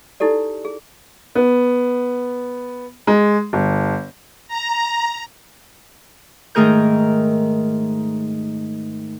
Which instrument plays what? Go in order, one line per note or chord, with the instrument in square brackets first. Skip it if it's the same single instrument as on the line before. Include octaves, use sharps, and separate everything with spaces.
[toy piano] D#4 E4 G4 A4 D5
G#4
[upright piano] B3
G#3
G1
[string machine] A#5
[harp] G#2 D#3 A3 G#4 A#4 G6